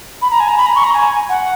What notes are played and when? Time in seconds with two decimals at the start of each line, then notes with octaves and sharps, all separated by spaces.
0.22 B5
0.31 A#5
0.40 G#5
0.48 A#5
0.58 B5
0.66 A#5
0.76 C#6
0.84 A#5
0.94 G#5
1.29 F#5